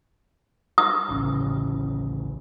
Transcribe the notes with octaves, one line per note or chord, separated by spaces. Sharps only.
D#6
D1 A1 C#3